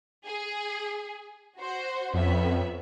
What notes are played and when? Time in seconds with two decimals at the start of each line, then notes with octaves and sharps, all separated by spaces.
0.25 G#4
1.57 F#4 C5
2.14 F2 B3 C#4 E5